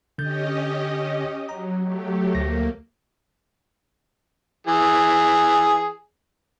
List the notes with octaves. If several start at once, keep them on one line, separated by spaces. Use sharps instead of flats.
D3 C#4 G4 D#5 G6 A6
F#3 A#5
F#3 A3 G4
D2 A#3 A#6
E3 G#4